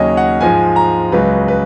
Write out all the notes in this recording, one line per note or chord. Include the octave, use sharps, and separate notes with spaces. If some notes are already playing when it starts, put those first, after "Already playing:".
Already playing: D#2 C#3 F#3 C#5 D#5
F#5
G#2 F3 G#3 G#5
A#5
C#2 C#3 F#3 B4
B4